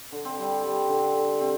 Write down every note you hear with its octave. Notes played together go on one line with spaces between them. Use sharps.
D3
C4
G3
G3
D3
D3
C3 C4